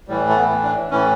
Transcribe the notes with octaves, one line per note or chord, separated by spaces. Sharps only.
A2 E3 G3
A3
B3
D4
A2 E3 C#4